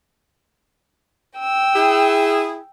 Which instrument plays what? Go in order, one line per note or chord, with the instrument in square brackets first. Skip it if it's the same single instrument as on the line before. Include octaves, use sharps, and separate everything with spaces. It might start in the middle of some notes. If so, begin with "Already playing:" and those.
[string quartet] G5 E6
[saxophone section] E4 G#4